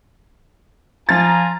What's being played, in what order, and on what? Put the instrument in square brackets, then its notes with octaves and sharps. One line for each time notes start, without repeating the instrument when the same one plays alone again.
[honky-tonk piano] F3 A6 [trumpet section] F4 G#5 A#5